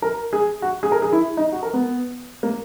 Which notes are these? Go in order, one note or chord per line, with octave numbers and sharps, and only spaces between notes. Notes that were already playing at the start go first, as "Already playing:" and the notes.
A#4
G#4
F#4
G#4
A#4
G#4
E4
D#4
F#4
A#4
B3
A#3